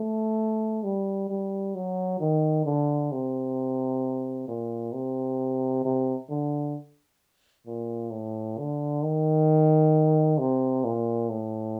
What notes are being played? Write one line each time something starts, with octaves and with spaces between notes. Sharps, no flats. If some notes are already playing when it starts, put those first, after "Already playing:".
Already playing: A3
G3
G3
F#3
D#3
D3
C3
A#2
C3
C3
D3
A#2
A2
D3
D#3
C3
A#2
A2